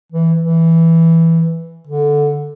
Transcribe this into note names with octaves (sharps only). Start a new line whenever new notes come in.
E3
E3
D3